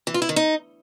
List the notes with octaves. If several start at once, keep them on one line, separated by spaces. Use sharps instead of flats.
E3
F4
E4
D#3
D#4